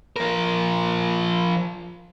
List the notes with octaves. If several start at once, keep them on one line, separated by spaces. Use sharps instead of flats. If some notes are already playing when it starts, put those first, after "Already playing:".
F3 A#4